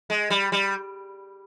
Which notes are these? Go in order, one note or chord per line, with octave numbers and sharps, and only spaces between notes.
G#3
G3
G3